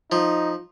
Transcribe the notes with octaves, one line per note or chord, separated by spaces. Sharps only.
F3 D#4